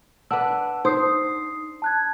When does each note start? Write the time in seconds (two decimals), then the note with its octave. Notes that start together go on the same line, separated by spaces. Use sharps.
0.31 D4 B4 F#5 E6
0.85 D#4 C5 D#6 C7
1.82 A5 F#6 G#6